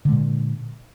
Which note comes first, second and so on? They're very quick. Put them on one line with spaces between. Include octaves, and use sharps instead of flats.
D3 G#3 A#2